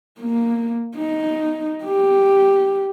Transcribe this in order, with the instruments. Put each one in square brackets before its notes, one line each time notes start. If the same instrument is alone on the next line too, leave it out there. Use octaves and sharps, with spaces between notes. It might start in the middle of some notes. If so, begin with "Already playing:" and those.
[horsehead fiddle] A#3
D#4
G4